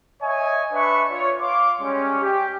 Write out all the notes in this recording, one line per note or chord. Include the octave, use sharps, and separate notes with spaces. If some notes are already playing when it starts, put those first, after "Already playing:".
C#5 D#5 E5 G#5
D4 B4 E5 B5 C#6
F4 C#5
F5 C6 D6
G3 G#3 C#4
G4